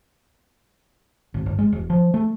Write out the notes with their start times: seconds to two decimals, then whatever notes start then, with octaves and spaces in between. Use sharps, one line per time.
1.34 G#1
1.46 G1
1.59 G#3
1.73 E1
1.90 F3
2.14 A3